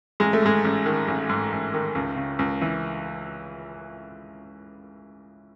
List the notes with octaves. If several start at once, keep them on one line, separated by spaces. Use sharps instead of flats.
A1 G#3
A3
G#2 G#3
A1
D#3
A1
G#2
A1
D#3
C#2
C#3
C#2
E3